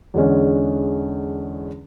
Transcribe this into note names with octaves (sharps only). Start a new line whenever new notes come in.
E2 D3 G#3 C#4